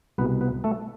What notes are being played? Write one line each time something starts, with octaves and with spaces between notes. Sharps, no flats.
C2 B2 B3 B4
B3 B4
A3 A4